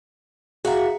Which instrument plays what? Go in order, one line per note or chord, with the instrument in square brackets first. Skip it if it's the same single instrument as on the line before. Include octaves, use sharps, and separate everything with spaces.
[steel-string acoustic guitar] F#4 E5 [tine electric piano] G#4 F5 A#5